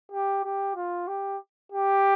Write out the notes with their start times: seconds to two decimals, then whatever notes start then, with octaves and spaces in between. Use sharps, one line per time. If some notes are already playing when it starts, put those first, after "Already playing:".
0.12 G4
0.44 G4
0.76 F4
1.08 G4
1.72 G4